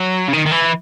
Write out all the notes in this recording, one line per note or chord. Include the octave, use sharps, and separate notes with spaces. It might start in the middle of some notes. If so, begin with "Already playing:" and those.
Already playing: F#3
C#3
D#3
D#3
E3